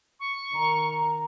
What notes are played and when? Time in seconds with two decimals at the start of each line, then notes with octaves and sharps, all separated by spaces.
0.20 C#6
0.54 D#3 A#5
0.89 A#5